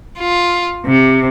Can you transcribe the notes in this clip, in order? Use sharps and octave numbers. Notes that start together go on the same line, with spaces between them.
F4
C3